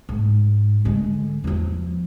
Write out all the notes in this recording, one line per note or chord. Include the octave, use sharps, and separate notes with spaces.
G#2
D3 G#3
E2 F3